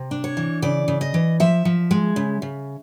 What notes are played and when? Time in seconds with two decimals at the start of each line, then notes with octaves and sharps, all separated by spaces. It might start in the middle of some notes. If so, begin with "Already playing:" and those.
Already playing: C3
0.11 D4
0.24 C#5
0.37 E3
0.62 C#3 D5
0.88 C#3
1.01 D#5
1.14 E3
1.40 F3 E5
1.65 F3
1.91 G#3
2.16 C#3
2.42 C#3